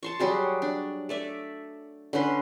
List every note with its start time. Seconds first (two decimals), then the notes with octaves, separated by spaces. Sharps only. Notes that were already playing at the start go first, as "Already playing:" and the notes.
0.03 A5 C6 C#6
0.20 F#3 G3 F#4 G#4
0.62 D4
1.09 A3 D5 E5
2.13 D3 C#4 B4 C6